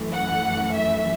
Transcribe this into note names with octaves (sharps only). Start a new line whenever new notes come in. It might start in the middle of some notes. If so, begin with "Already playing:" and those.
Already playing: F#2 E3 A3
F#5
E5